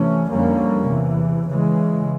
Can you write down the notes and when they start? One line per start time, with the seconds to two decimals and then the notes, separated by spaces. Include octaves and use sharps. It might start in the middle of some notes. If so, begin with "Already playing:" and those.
Already playing: C3 E3 A3 C#4
0.28 F2 D3 G3 A#3 C#4
0.87 E2 C3 E3
1.47 C#3 E3 G#3